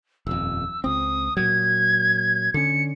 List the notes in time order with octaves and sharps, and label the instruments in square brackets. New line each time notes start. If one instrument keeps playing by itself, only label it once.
[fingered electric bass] D#1 F2 [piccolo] E6
[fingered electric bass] C#2 C4 [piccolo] D#6
[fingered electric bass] A#2 F#3 [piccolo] G#6
[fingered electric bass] D3 C#4 [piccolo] C#7